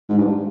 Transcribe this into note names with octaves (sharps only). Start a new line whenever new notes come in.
G#2
G2